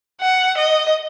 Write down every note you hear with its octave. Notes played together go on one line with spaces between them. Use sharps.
F#5
D#5